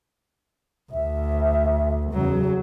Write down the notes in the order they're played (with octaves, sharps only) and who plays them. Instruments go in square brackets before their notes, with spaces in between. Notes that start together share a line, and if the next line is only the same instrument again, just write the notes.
[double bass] D2 [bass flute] E5
[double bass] E2 F#3 [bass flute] C#3